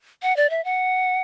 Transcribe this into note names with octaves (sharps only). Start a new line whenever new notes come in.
F#5
D5
E5
F#5